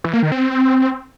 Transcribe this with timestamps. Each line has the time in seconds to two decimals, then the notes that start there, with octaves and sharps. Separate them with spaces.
0.04 E3
0.13 A#3
0.23 D#3
0.32 C4